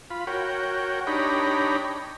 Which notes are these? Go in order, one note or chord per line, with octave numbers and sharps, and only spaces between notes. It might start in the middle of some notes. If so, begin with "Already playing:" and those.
F4 B5
F#4 A#4 C#5 G5
D4 D#4 G4 C#5 A#5 B5